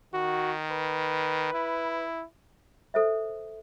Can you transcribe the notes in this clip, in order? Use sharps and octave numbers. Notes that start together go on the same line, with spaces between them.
D#3 F#4
B4
E4
A4 C5 E5